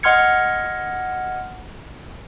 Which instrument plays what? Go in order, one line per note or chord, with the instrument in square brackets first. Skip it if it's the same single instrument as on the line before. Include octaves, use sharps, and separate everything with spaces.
[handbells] D#5 F#5 C6 F6 G#6 C#7